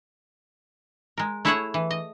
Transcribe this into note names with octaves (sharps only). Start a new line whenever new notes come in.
G#3 A#4
A3 E4 G#4 C#5 E5 F#5
E3
D#5